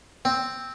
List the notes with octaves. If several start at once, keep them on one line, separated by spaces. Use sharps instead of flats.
C4